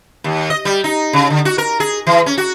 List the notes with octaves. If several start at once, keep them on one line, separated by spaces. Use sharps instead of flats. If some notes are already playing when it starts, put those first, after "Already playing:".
D#2
D#5
G3
D#4
C#3
D3
F#4
A#4
G#4
E3
C#4
F#4